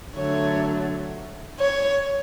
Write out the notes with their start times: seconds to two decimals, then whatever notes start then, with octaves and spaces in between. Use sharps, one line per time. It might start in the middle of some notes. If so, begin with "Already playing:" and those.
0.15 D3 F#3 A3 C#5
1.60 C#5